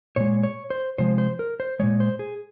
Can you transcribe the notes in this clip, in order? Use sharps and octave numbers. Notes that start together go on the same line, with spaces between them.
A#2 G#3 C#5
C#5
C5
C3 F3 G#3 C5
C5
A#4
C5
A#2 F3 G#3 C#5
C5
G#4